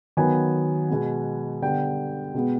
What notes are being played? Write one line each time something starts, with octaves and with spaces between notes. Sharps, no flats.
D#3 F#3 B3 G#5
B2 G#3 B3
D3 G3 B3 G5
B2 G#3 B3